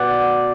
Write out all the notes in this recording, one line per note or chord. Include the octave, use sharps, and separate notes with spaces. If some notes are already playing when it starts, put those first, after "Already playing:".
Already playing: B2 D5 F#5